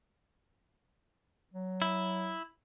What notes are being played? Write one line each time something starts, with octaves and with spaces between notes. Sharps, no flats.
F#3
E4